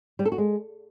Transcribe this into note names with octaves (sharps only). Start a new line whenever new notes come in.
G3
A4
F#4
G#3